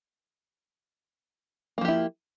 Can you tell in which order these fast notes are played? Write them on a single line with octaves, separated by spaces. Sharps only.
A#3 F3 G4 E4